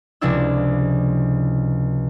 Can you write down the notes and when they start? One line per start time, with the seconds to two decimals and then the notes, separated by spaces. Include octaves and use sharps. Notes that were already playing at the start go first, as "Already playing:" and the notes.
0.21 C#2 C3 F3 D4 E4 E6